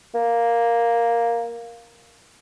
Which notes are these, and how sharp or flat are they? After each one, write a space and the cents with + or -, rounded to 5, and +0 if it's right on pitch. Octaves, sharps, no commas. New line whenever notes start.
A#3 +0